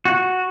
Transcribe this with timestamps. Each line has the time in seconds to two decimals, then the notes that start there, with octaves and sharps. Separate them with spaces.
0.05 F#4